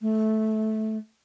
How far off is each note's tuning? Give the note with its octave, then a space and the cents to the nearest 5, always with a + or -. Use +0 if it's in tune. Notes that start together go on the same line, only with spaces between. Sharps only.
A3 -15